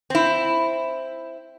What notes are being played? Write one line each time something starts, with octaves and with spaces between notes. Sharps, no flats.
C4 E4